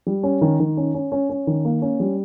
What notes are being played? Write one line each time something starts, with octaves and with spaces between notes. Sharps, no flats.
G3
C#4
D#3
D#3
C#4
C#4
C#4
C#4
D#3
A#3
C#4
G3